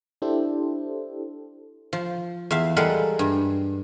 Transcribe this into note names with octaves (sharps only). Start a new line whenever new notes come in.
D4 E4 G4 A4 C5
F3
E2 E5 F5
G3 G#3 A4 A#4 F5 F#5
G2